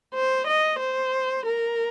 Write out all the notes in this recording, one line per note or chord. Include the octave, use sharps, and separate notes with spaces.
C5
D#5
C5
A#4